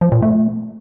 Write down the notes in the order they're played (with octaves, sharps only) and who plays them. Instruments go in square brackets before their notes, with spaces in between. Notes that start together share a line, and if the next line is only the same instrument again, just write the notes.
[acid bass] F3
A#2
A3